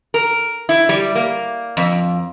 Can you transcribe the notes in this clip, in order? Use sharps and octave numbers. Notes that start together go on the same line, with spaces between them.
A#4
E4
G3
A#3
F2